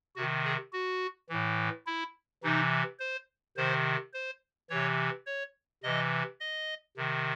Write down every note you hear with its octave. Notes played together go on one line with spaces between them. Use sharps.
C3 D#3 F#4
G#4
F#4
A2 E3
E4
C3 E3 D#4
C5
C3 D#3 C5
C5
C3 E3 C#5
C#5
C3 E3 D#5
D#5
C3 D#3